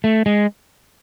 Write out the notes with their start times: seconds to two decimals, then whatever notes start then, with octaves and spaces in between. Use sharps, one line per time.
0.04 A3
0.26 G#3